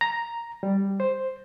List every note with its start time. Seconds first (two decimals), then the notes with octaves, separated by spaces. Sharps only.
0.01 A#5
0.63 G3
1.00 C5